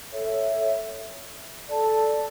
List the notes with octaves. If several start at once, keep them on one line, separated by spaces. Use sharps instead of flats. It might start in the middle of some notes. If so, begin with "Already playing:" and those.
A4 C#5 E5
A4 D5 A5